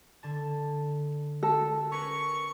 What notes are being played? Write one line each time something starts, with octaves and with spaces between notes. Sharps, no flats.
D3 A5
A4
C#4 A#4 B4 C#6